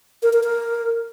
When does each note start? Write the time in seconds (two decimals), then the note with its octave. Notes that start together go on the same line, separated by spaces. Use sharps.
0.23 A#4
0.33 A#4
0.43 A#4